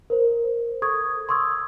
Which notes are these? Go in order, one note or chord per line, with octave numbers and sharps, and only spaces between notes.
A#4 C5
A4 C#6 D#6 G#6
C6 C#6 D#6 E6 G#6